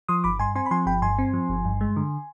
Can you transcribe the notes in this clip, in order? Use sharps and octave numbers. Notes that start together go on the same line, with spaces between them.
F3 C6 D#6
G1 B5 D6
G2 G#5 C6
C4 G#5 C6
B5
F3 G#5 C6
G1 G5 B5
G2 G#5 C6
C4
F3
G1
G2
G#3
D3